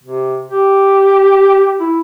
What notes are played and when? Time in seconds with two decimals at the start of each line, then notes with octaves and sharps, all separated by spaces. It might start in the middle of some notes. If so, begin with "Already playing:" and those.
0.03 C3
0.49 G4
1.81 E4